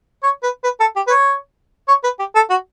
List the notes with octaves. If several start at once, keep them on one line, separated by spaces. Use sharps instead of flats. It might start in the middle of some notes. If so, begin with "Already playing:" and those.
C#5
B4
B4
A4
G4
B4
C#5
C#5
B4
G4
A4
F#4